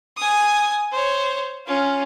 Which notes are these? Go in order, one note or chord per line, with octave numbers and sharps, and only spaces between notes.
G#5 D#6
C5 C#5
C#4 F4